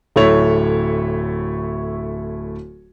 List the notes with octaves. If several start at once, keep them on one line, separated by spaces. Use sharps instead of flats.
D1 A3 E4 C#5 F7